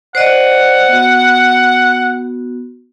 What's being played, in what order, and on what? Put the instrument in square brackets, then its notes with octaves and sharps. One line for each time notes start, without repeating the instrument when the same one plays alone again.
[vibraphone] C5 D5 D#5 [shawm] F#5
[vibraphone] B3 F#4